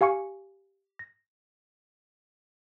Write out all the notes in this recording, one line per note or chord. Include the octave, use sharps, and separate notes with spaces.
G4 F5 G#5 C#6 C#7
A#6